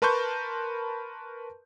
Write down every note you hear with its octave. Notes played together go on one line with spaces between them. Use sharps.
A#4 B4 A5 C6 C#6 G6